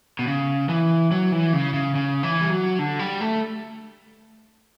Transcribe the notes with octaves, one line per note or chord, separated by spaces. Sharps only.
B2
C#3
E3
F#3
E3
C#3
C#3
C#3
E3
G3
F#3
D3
G3
A3